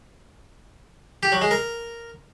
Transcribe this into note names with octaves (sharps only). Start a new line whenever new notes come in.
G4
F#3
G#3
A#4